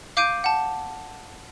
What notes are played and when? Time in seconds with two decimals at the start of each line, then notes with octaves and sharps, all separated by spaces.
0.17 F5 D6 G6 C7 D7 D#7
0.44 F#5 A5